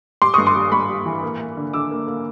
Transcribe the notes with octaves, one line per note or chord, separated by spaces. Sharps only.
G3 C6 D6
G2 C#6 D#6
C6 D6
G3
G2 B5 C#6
G3
E3
A#3
A#3
D3
D3 D6 E6
A#3
A#3